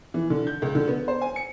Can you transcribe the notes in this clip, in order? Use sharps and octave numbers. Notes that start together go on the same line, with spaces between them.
E3
D3
G6
C#2
D3
B3
C5
G#5
C#7